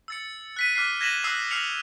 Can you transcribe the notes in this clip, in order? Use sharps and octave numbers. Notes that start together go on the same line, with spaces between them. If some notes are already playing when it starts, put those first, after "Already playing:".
E6 A6 C#7
F#6 B6 D#7
D6 F6 F#6 B6 C7
G#6 A#6 B6 D#7 E7 F#7
D#6 E6 F#6 C7
F6 F#6 A#6 C7 C#7 F7